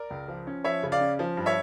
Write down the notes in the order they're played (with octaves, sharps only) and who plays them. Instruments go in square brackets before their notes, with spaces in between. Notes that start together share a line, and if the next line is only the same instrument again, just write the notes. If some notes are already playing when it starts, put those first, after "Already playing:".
Already playing: [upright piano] A#4 D5
C#2
F3
C#4
F3 C#5 E5
C#3
D5 F5
C#4
F3
G2
C#5 E5